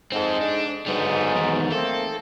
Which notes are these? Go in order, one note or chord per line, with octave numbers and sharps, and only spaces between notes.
G#2 C4 A4
D4
B1 G#2 G3 B3
E2 D#3
A3 A#3 C4 A4